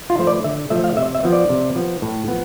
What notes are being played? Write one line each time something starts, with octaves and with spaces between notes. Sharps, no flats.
F4
F3 A3 C5
D5
D3 E5
F3 A3 E5
F5
C3 E5
E5
F3 B3
D5
C3
F3 B3
A2
F3 B3